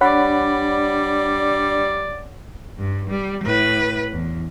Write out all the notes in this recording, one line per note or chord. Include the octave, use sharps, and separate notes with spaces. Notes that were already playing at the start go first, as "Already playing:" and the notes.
G3 D4 C#5 D5 F#5 B5
G2
G3
A2 B4
E2